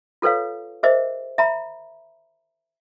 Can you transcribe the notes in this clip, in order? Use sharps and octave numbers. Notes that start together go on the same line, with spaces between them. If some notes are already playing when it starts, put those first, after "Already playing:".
F4 A4 B4 C#5 F5
G#4 A#4 C5 D#5 E5
E5 A#5 B5